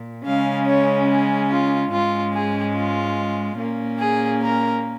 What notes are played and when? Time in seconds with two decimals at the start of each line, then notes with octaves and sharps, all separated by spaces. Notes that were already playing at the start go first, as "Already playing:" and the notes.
Already playing: A#2
0.25 C#3 G#3 C#4 F5
0.66 C#5
1.08 G#4
1.50 F4
1.91 G#2 G#3 C#4 F4
2.33 G#4
2.74 F4
3.57 A#2 A#3 C#4
3.98 G#4
4.41 A#4